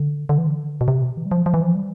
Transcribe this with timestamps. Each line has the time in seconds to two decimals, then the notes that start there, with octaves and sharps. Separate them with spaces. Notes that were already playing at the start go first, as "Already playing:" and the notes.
Already playing: D3
0.29 D3
0.38 E3
0.47 D3
0.81 B2
0.88 C3
1.03 B2
1.17 E3
1.26 G3
1.31 F3
1.46 F3
1.54 E3
1.62 F3
1.75 G3